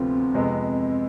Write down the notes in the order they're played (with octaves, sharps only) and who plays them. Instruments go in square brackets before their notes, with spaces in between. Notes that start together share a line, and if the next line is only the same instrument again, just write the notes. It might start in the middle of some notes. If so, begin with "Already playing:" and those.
Already playing: [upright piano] D2 C3 F3 B3 F4 [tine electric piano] C4
[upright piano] F2 C3 G#3 B3